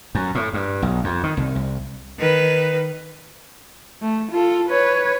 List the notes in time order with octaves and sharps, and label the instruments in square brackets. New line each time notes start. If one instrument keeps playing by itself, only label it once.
[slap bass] F#2
A2
G2
B1
F2
D#3
C2
C2
[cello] D#3 B4
[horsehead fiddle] A3
F4 A4
B4 C#5